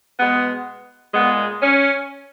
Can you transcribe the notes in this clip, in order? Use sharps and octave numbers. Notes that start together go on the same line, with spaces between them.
B2 G#3 B3
A#2 G#3 B3
C#4